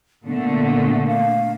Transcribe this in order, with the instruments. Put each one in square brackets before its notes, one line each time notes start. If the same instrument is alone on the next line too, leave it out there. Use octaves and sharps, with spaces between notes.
[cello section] A#2 D3 A3 [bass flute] B3
[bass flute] F5